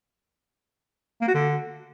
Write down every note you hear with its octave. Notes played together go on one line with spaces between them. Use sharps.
A#3
F#4
D3